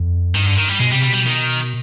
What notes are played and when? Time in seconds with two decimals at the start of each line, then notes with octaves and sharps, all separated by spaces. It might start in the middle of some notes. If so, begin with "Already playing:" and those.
Already playing: F2
0.34 G2 D#3
0.46 D3
0.58 D#3
0.68 G3
0.79 B2 G#3
0.92 C3 G3
1.02 G3
1.06 B2
1.13 G3
1.26 D#3